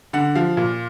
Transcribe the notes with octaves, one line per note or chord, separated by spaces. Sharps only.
D3 F#5
F3 F5
A#2